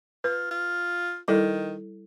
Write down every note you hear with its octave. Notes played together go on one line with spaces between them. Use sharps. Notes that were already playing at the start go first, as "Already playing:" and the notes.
F4 B4
F4
D#3 G3 E4 A4